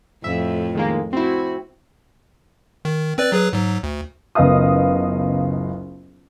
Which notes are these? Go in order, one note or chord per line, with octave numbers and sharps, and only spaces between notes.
F2 A2 F3 E5
D#3 G#3 A#3
C4 E4 F#4
D#3
C4 B4 D5
F#3 G#4 B4
G#2 F#3
D2
F#1 C#2 B3 D#5 F5 D#6